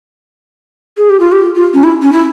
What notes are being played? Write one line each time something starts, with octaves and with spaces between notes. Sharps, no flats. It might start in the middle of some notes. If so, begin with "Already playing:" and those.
G#4
G4
F4
G4
F4
C#4
E4
C#4
E4